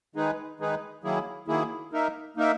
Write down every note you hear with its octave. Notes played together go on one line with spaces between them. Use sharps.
D#3 G#3 D#4 G#4 B4
D#3 G#3 D#4 G#4 B4
D#3 F#3 A#3 E4 G#4
D#3 F#3 A#3 E4 G#4
A#3 D#4 A#4 E5
A#3 D#4 A#4 E5